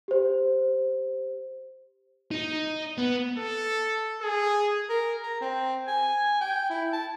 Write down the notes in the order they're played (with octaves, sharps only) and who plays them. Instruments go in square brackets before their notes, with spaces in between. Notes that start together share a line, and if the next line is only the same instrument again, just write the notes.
[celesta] G4 C5
[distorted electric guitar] D#4
B3
[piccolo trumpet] A4
G#4
[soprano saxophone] A#4
A#5
C4
G#5
G5
E4
A5